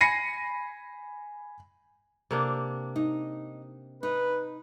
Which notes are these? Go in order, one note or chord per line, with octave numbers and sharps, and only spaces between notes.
G#5 B5 A#6 C7 C#7 D#7
C3 A#3 D4
D#4
D#4 B4